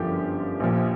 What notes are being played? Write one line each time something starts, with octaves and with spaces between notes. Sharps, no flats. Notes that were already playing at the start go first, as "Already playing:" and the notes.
Already playing: G1 F#2 D3 F3 F4 G4
A#1 A#2 F3